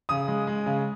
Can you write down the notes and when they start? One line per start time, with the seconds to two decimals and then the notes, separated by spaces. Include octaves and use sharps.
0.09 C#3 D#6
0.28 G#3
0.47 G#3
0.66 C#3